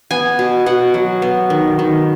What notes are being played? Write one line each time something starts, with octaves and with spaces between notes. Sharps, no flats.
B3 G#5
B2
B2 F#5
F#3
B3
D#3
D#3